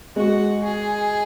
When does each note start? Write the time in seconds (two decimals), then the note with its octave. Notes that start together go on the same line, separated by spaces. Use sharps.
0.16 G#3 F#4
0.64 G#4